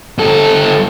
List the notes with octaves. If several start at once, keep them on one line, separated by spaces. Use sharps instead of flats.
G2 A4